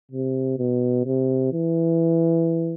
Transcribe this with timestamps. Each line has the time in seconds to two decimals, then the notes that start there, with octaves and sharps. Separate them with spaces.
0.12 C3
0.58 B2
1.06 C3
1.53 E3